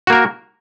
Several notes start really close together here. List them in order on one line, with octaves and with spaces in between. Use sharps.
F#4 A#3 A#4